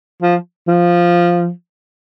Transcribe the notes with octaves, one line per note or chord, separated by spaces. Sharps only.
F3
F3